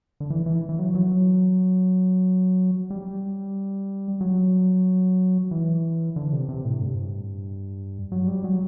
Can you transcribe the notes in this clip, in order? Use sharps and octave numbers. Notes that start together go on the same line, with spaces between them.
D3
E3
E3
E3
F#3
F#3
G3
F#3
E3
D3
C3
C3
A2
G2
F#3
G3
F#3